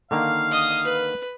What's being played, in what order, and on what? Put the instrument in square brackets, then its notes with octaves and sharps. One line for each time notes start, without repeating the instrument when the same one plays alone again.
[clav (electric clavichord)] D3 D#3 A#3 [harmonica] F5
[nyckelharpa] D#5 D#6
B4